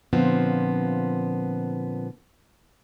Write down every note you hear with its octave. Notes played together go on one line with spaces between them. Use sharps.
A#2 D3 F3 B3 C4